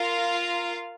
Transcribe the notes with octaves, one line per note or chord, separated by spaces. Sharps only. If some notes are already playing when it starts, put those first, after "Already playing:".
Already playing: F4 A#4 F5